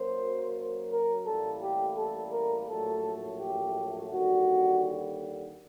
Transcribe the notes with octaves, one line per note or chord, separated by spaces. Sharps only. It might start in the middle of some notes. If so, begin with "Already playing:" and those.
Already playing: F#2 F#3 A#3 C5
A#4
A1 A2 G3 A#3 A4
G4
A4
A#4
A#1 A2 F#3 A3 A4
G4
D#2 D3 G3 F#4